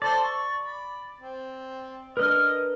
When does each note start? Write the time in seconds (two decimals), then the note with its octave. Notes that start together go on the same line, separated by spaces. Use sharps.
0.02 A4 C5 D5 A5
0.23 C#6
0.63 B5
1.20 C4
2.17 D4 A#4 B4 D#5 F6